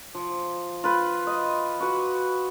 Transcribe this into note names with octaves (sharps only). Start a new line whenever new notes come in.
F3
F4 B4
D#5
F#4 B4